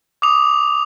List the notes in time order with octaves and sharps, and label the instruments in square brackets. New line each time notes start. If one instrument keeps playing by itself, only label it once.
[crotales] D6 D#6 F7